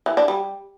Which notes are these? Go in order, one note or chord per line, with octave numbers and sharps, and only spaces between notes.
E3
D4
G3